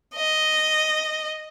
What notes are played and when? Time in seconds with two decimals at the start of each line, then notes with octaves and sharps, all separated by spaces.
0.15 D#5